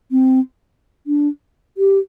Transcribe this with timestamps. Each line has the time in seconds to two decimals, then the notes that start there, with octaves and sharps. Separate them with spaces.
0.11 C4
1.07 D4
1.78 G4